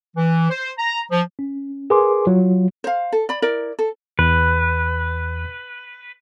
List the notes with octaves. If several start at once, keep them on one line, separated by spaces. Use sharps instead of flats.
E3
C5
A#5
F3
C#4
G#4 A#4 B4 G#5 C6 D6
F#3 F4
C5 F5
A4
D5 B5
E4 A#4 D5
A4
E2 B4